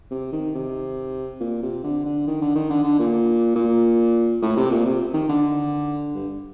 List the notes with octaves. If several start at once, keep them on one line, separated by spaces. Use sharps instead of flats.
C3
D#3
C3
A#2
C3
D3
D3
D#3
D3
D#3
D3
D3
A#2
A#2
A2
C3
A#2
C3
D#3
D3
G2